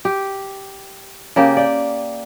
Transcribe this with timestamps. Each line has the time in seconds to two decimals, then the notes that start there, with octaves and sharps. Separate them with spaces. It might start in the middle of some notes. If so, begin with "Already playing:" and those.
0.05 G4
1.36 C#3 A#3 G4
1.57 D5 G5